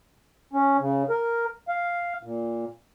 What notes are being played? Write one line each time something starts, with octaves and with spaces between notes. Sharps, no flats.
C#4
C#3
A#4
F5
A#2